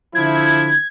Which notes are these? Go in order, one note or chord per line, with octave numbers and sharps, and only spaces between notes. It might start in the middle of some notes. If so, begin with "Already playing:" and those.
D3 F3 E4 G#6
G#6